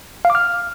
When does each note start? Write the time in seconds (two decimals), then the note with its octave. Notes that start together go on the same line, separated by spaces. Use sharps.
0.25 F5
0.30 D6
0.35 F6